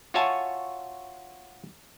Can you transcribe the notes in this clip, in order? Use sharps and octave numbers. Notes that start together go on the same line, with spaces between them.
F4 F#4 C#5 E5 G#5 A5